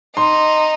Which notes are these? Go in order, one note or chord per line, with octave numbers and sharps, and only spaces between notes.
D#4 C6